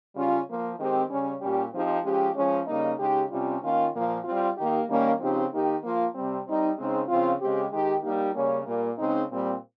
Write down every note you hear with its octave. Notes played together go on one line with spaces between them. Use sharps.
C#3 G3 C#4 F4
F3 A#3 F4
D#3 G#3 C4 G4
C#3 G3 C#4
A#2 G3 C#4 G4
F3 C4 D#4 G4
F3 G#3 C#4 G4
F3 G#3 C#4
C#3 G3 A#3 D#4
C#3 G#3 D#4 G4
C3 G3 C#4 F4
D#3 A#3 C#4 F4
A#2 F3 A#3
G3 C4 F4
D#3 A#3 D#4 G4
D#3 G3 A#3 C#4
C#3 F3 C4 D#4 G4
D#3 A#3 D#4 G4
F3 A#3 F4
C3 G3 C4
G3 C4 D#4
C#3 G#3 C4 D#4
C#3 F3 C4 F4
C#3 G#3 C4 G4
D#3 G#3 D#4 G4
G3 A#3 D#4 G4
C#3 G3 A#3 C#4
A#2 G3 A#3
C#3 G#3 C4 D#4
A#2 G3 C4